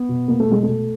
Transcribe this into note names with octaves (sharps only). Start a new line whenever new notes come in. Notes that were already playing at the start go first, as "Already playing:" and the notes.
Already playing: B3
B2
B2 A#3
A3
B2 G#3
A3
B2